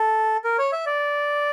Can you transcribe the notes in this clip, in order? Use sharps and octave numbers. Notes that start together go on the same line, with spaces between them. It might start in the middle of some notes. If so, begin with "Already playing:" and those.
Already playing: A4
A#4
C#5
E5
D5